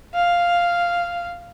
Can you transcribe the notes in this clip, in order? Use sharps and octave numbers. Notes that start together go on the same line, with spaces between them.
F5